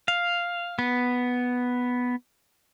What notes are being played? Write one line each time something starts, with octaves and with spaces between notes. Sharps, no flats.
F5
B3